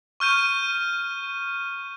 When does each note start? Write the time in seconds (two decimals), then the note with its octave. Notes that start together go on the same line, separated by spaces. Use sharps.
0.20 C#6 F6 G6 D#7